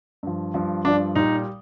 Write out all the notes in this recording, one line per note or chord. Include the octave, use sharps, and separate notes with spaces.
G2 F3
G2 F3
G2 F3 D4
A#2 G3 D#4